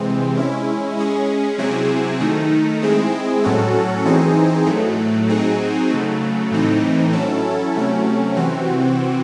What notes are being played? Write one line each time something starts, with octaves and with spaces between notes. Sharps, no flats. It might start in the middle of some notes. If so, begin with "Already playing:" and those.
Already playing: C3 E3 G#3 C4
G#3 C#4 E4
G#3 C#4 G#4
C3 F#3 C4 E4 G#4
D#3 A3 D#4
G#3 C4 E4 G#4
A2 F#3 C#4 F#4 A4
E3 C4 D#4 G#4
A2 F#3 A3
F#3 C4 D#4 G#4
C#3 F#3 A3
A2 E3 A3 C4 D#4
F#3 C#4 E4 A4
C3 F#3 A3 C#4
C3 E3 C4 F#4